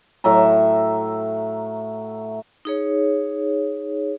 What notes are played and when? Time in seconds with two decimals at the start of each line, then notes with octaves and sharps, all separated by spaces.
0.24 A2 F#3 E5 A#5
2.65 D#4 G#4 C#5